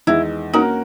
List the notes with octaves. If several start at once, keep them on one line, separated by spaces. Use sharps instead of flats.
E2 D#3 G#3 E4
A#3 C#4 D#4 F#4 A#4